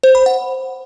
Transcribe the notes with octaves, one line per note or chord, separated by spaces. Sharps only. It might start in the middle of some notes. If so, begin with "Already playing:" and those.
C5
B5
F#5